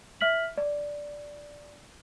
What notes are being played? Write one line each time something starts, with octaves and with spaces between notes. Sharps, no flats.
E5 F6 B6 F#7
D5